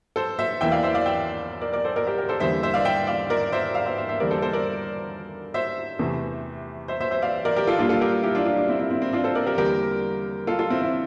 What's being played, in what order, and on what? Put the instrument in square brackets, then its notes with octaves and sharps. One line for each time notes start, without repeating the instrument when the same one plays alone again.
[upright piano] A4 C5
C5 E5
E2 E3 A#3 E5 G5
D5 F5
C5 E5
D5 F5
E5 G5
A#4 D5
A#4 D5
A4 C5
A#4 D5
G4 A#4
G4 A#4
A4 C5
E2 D3 G3 A#3 C5 E5
C5 E5
D5 F5
E5 G5
D5 F5
A#4 D5
C5 E5
D5 F5
C5 E5
C5 E5
C5 E5
E2 D3 G3 A#3 A#4 D5
A4 C5
A4 C5
A#4 D5
C5 E5
E2 C3 E3 A3
C5 E5
C5 E5
C5 E5
D5 F5
A#4 D5
G4 A#4
F4 A4
A#2 G3 A#3 D4 F4
F4 A4
G4 A#4
E4 G4
D4 F4
D4 F4
D4
C4 E4
C4 E4
C4 E4
C4 E4
D4 F4
A4 C5
A#4 D5
G4 A#4
E2 D3 G3 A#3 G4 A#4
F4 A4
F4 A4
C4 E4
C4 E4